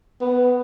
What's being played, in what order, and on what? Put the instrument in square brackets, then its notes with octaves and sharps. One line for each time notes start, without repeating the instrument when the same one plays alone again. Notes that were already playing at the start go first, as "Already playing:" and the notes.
[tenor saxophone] B3